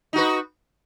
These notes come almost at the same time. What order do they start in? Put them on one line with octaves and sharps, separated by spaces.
D#4 F#4 B4